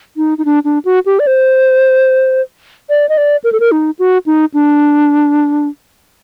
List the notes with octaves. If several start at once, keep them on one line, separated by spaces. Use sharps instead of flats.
D#4
D#4
D4
D4
F#4
G4
D5
C5
D5
D#5
D5
A#4
A4
A#4
D#4
F#4
D#4
D4